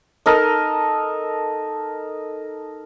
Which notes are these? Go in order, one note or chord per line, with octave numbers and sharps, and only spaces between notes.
D#4 A4 A#4 D#5